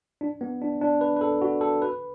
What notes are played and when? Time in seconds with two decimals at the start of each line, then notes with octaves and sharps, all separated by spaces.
0.21 D4
0.41 B3
0.62 D4
0.81 D4
1.01 B4
1.16 B4
1.21 A4
1.41 F#4
1.61 A4
1.82 B4